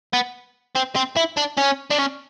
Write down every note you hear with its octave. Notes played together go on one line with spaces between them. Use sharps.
B3
C4
C4
E4
D4
C#4
D4
C#4